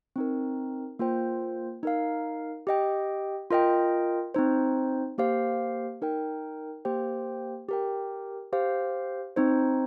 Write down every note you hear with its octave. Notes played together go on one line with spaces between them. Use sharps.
C4 D#4 A#4
A#3 F4 C5 G5
D#4 A#4 F5
G4 D#5 G5
F4 A#4 D#5 G5
C4 D#4 C5
A#3 G4 C5 F5
D#4 A#4 G5
A#3 G4 C5 G5
G4 A#4 G5
G4 C5 F5
C4 D#4 C5